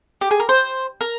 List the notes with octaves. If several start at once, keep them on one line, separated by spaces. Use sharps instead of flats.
G4
G#4
A#4
C5
A#4